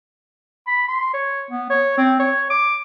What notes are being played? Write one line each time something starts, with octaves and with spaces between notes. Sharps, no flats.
B5
C6
C#5
B3
C#5
C4
C#5
D6